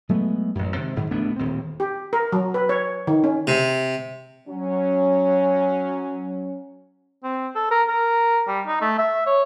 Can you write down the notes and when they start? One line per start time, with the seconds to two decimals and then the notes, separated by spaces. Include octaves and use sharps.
0.09 F#3 G#3 A3 B3
0.55 A1 F#2
0.76 C3 D#3 G#3
0.96 F#1 G#2 D#3
1.11 E1 A3 B3 D4
1.36 D#1 D#2 A2 C4
1.80 G4
2.13 A#4
2.32 F#3
2.54 B4
2.69 C#5
3.07 D#3
3.24 C#4
3.47 C3
4.47 F#3 C#4
7.23 C4
7.55 A4
7.71 A#4
7.88 A#4
8.47 G3
8.67 D#4
8.81 A3
8.98 E5
9.26 C#5